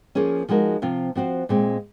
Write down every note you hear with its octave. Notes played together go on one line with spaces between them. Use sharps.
F3 A#3 C#4 G#4
F3 G#3 D#4 F#4 A#4
C3 F3 C4 F4
F3 C4 F#4 C5
A#2 G#3 C4